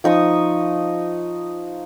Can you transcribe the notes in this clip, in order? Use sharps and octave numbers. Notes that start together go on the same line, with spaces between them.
F3 D#4 C#6 D#6